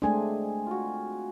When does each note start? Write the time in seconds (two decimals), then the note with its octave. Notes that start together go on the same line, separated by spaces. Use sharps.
0.02 G#3 A3 C4 D4 G#4 G#5
0.67 F4 F#4